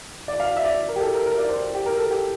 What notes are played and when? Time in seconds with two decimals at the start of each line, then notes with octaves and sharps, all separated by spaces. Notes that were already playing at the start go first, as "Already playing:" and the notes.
0.28 D5
0.40 F5
0.57 E5
0.64 D5
0.88 A#4
0.96 G4
1.01 A4
1.14 A#4
1.26 A#4
1.38 D5
1.49 C5
1.75 G4
1.86 A#4
1.98 A4
2.11 G4